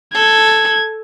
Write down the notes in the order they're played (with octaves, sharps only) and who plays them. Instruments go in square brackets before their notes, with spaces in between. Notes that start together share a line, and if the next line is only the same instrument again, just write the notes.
[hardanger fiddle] A4 [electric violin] G#6